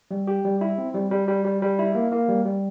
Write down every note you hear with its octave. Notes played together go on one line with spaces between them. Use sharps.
G3
G4
G3
E4
C4
G3
G3
G3
G3
G3
E4
A#3
A#3
G3
G3